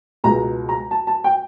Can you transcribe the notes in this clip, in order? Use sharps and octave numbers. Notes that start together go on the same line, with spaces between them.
C#2 B2 G#3 A#5
A#5
A5
A5
G5